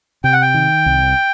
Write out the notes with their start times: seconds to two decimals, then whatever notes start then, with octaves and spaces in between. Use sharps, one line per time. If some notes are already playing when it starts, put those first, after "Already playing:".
0.24 C3 G5
0.33 F#5
0.42 G5
0.54 D#3
0.86 C2